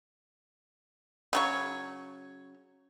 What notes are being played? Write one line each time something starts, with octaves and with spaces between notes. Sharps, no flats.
C#3 F#3 C#5